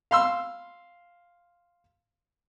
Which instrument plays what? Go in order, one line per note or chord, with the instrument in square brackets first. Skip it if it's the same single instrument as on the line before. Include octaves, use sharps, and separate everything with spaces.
[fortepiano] F5 C6 E6